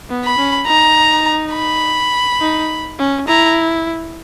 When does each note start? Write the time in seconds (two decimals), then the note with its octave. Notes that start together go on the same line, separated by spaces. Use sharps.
0.10 B3
0.24 B5
0.38 C#4
0.67 D#4 A#5
1.54 B5
2.41 D#4
2.99 C#4
3.28 E4 A#5